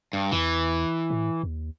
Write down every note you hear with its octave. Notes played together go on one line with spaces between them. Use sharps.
G2
E2 E3
A2
D#2